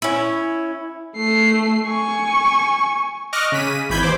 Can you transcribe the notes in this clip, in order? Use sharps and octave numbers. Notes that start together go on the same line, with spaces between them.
C#4 E4
A3 C7
G#5 C#6
D#5 C#6 D6 F6 F#6 A#6
C#3 B6 D#7
G#1 E3 B5 G6 G#6 B6
D#2 C5 D6